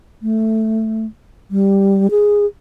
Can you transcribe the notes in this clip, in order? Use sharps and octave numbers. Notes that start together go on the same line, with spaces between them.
A3
G3
G#4